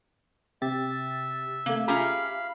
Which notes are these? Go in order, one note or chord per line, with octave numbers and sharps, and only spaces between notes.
C3 G4 E5 A6
C3 A3 A#3
C#4 F4 G4 G#4 E5 F5 A#5 B5